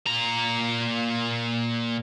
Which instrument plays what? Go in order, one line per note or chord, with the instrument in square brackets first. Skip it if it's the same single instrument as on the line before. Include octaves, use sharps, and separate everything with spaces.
[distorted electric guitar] A#2 A#5